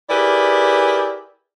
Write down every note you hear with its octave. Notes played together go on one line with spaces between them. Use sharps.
E4 G4 G#4 A#4 B4 D5